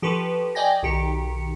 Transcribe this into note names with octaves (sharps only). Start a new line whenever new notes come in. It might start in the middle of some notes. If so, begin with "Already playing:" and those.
F3 G4 A4 B4 C#6
D5 D#5 G5 G#5 A#6
B1 D#3 G4 C#7